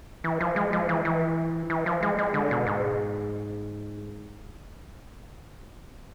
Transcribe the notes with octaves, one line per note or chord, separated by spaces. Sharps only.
E3
F3
G#3
F3
E3
E3
E3
F3
G#3
G#3
D3
B2
G#2